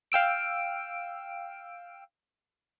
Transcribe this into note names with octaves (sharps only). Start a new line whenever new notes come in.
F5 G5 E6 D7